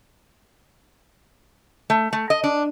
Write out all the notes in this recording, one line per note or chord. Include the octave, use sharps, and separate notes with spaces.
A3
A3
D#5
D4